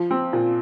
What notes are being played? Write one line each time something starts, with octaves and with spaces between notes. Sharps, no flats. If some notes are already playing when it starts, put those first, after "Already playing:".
Already playing: F3
C4
A#2